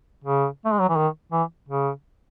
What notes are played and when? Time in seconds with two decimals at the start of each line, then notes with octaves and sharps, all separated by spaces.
0.24 C#3
0.65 A3
0.73 G#3
0.80 F#3
0.89 E3
0.97 D#3
1.32 E3
1.69 C#3